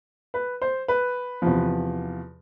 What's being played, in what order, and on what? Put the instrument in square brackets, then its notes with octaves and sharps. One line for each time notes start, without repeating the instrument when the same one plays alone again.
[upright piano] B4
C5
B4
E2 C3 F3